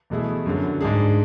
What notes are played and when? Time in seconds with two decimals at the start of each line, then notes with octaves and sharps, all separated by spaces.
0.10 E2 B2 A3 E4 G#4
0.46 F#2 D3 F#3
0.81 G#2 G#3 D4 G#4